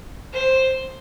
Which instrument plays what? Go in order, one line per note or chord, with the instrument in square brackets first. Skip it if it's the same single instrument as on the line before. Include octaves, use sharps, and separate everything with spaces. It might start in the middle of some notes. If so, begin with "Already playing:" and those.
[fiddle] C5